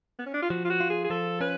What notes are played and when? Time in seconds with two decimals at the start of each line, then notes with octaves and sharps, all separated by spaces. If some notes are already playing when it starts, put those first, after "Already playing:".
0.19 B3
0.26 C#4
0.34 D4
0.42 F4
0.50 F3 F#4
0.65 F4
0.70 F#4
0.80 F4
0.90 G#4
1.04 G#4
1.10 F3 A4
1.41 C#4 B4